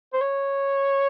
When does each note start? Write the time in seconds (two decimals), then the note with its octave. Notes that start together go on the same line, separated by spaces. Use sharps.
0.13 C5
0.21 C#5